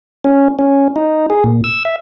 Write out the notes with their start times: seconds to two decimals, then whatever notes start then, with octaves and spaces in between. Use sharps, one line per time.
0.24 C#4
0.59 C#4
0.96 D#4
1.30 G#4
1.44 A#2
1.64 E6
1.85 E5